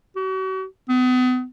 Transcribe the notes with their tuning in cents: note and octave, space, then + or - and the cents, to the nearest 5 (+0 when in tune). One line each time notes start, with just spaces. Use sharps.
F#4 +40
B3 +40